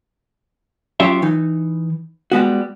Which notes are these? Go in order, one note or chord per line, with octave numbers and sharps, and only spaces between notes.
F#3 C#4 F4 G4 E5
E3 D#4
G3 G#3 B3 F#4